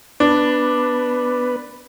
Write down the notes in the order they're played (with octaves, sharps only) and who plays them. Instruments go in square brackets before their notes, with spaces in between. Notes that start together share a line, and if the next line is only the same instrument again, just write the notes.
[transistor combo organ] B3 B4 [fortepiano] D4